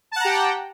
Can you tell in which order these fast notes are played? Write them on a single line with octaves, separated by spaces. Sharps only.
A5 F#5 A#5 G4 G5